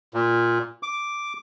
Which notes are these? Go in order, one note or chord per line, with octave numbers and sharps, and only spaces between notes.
A#2
D6